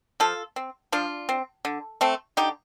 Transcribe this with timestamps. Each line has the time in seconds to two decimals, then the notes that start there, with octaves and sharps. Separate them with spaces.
0.20 F3 F4 A4
0.56 C4
0.92 F3 D4 F4
1.29 C4
1.65 D3
2.01 A3 C4
2.37 D3 D#4 G4